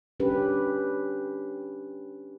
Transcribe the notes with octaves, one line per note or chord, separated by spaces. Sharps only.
C#4 D4 G4 B4